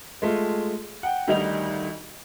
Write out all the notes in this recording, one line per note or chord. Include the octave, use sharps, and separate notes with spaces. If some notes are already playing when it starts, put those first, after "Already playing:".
G#3 A3 F4
F#5 G5
D2 D#3 G3 D#4 F7